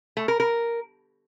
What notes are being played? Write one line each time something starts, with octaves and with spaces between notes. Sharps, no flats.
A3
A#4
A#4